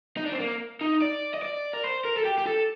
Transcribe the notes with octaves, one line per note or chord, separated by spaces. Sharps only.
D#4
D4
C4
A#3
D#4
D5
D#5
D5
A#4
C5
A#4
A4
G4
G4
A4